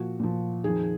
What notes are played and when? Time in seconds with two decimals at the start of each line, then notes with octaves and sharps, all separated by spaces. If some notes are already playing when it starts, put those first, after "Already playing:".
Already playing: A#2 F3 F#4
0.19 A#2 F3
0.64 F2 D#3 G#4